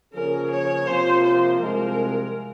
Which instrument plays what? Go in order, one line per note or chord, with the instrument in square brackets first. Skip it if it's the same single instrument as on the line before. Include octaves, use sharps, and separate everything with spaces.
[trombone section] C#3 F3 A#3 C#4 G#4 [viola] A#4
[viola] C#5
[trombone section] C3 F3 A#3 F4 [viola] C5
[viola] C5
[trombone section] C2 C3 F3 G#3 [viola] A#4